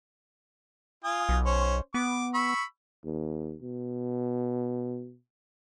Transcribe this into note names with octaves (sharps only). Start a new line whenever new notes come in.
F4 G#5 D#6
B1
C#4 C5 C#5
B3 D6
B5 C#6 E6
D#2
B2